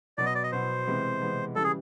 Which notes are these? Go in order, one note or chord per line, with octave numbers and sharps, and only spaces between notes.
B2 F#3 B3 D5
D#5
D5
D#5
B2 F#3 B3 C5
C3 E3 G#3 B3
C3 E3 G#3 B3
C#3 E3 G3 A4
G#4